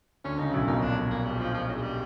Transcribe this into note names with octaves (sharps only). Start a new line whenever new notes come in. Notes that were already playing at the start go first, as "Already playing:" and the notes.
D2 D3 C#4
C#2 C#3 D#4
B1 B2 E4
A#1 A#2 D#4
D4
A#3
G3
F3
F3
F#3
G#3
G3